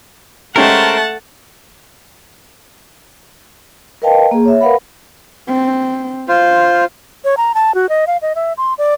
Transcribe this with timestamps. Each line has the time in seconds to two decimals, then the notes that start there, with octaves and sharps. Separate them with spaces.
0.56 G#3 A3 C#4 G4 A#4 C5 F#5 A5
4.02 A#4 B4 D#5 F5 G5 A5
4.31 A#3 G#4
4.45 C#5 E5
4.61 A#4 B4 F5 F#5 B5
5.48 C4
6.29 F4 C5 F5
7.25 C#5
7.37 A#5
7.55 A5
7.75 F#4
7.89 D#5
8.07 F5
8.22 D#5
8.35 E5
8.58 C6
8.78 D5